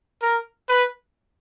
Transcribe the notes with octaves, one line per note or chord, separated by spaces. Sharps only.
A#4
B4